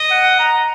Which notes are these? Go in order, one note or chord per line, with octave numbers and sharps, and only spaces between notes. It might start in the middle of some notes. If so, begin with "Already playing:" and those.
Already playing: D#5
F#5
A#5